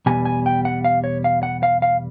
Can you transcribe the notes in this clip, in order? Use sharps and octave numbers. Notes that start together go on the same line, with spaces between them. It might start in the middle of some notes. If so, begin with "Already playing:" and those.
E2 B2 G3 G#5
G#5
G5
F#5
F5
C#5
F5
F#5
F5
F5